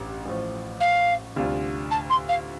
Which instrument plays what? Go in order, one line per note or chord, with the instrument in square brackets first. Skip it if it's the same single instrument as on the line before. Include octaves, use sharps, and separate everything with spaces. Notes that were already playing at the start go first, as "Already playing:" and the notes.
Already playing: [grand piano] A1 G2 G3
A1 A2 F3
[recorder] F5
[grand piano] D2 C3 G3 D4 F4
[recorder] A5
C6
F5